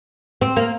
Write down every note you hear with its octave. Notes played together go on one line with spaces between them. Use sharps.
C4
A#3